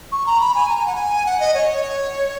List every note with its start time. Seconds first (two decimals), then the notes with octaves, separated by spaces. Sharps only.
0.12 C#6
0.26 A#5
0.40 B5
0.55 G#5
0.69 A#5
0.78 G#5
0.87 F#5
0.95 G#5
1.26 F#5
1.40 D#5
1.54 C#5